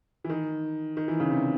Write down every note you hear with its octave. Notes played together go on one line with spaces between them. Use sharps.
E3
D#3
D#3
E3
C#3
C3